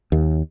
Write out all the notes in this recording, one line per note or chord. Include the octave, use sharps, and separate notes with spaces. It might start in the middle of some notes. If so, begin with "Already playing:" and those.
D#2